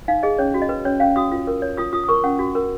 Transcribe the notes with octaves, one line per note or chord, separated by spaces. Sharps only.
D#4 F5
G#4 D#5
C#4 C#5
F#4
D#5
B4
C#4 C#5
C#4 F5
F#4 D#6
F4
A#4
C#5
F4 D#6
F4 D#6
D#6
A#4 C#6
C#4 F#5
F#4
A#4